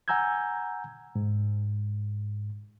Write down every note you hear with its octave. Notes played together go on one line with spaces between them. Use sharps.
F#5 G#5 A#5 E6 G6 G#6
G#2